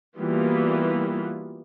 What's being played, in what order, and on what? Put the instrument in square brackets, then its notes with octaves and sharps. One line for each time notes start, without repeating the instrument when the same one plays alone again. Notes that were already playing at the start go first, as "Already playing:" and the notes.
[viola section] E3 G3 A#3 B3 F4 F#4